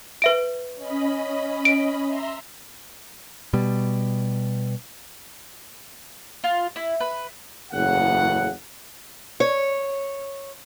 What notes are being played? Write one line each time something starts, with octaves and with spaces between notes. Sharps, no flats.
B4 E5 D7
C#4 D#5 B5
D7
E5 A#5 C6
B2 G3
F4
E4
B4
F#1 E2 A2 C#3 F#5
C#5